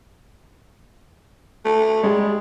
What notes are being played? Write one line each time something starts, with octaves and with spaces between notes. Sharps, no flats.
A3
G3 G#3